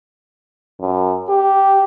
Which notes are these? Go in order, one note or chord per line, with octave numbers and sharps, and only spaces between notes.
F#2
G4